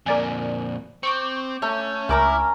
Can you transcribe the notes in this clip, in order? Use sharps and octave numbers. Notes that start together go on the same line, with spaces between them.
F2 A#2 A#4 D5 G#5
C4 C#6 D6 G6
A3 C#4
C#2 C#4 E4 A#4 A#5 D6